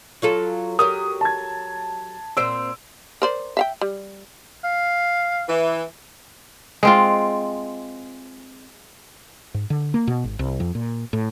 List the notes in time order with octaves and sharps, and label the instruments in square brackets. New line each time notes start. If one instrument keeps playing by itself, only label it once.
[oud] F#3 F4 A4
[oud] F#3 G4 A#4 [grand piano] D#6
[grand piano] A5 G#6
[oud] A#2 C4 C5 [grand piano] E6 D7
[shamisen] A#4 C5 D5
E5 F5 G5
G3
[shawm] F5
[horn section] E3
[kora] G#3 C4 F4
[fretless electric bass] G#2
D3
A#3
B2
G#1
C2
F2
A#2
A2